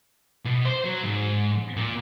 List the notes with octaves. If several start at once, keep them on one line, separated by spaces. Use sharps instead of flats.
B2
C5
F#3
G#2
A#2